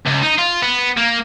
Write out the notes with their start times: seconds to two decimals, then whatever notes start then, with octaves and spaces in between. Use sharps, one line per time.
0.06 C#2
0.22 D#4
0.38 F4
0.62 B3
0.97 A#3